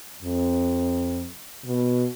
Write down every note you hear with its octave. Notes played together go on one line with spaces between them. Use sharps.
F2
B2